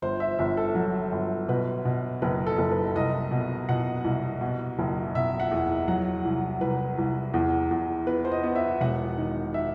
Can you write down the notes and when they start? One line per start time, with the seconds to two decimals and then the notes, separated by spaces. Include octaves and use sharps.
0.02 G1 C5
0.20 E5
0.39 G1 E5
0.57 A4
0.75 F#3
1.12 G1
1.48 B2 B4
1.85 B2
2.22 F#1 B4
2.47 A4
2.58 F#1
2.71 B4
2.95 C2 D#5
3.31 B2
3.69 B2 F#5
4.04 C2
4.41 B2
4.79 F#1
5.15 B2 E5
5.40 F#5
5.51 E2
5.88 F#3 F#5
6.25 C2
6.61 C2 B4
6.98 C2
7.34 E2
7.71 E2
8.07 B3 B4
8.25 C5
8.32 D#5
8.43 B3
8.56 E5
8.81 E1 F#5
9.18 D#3
9.54 E5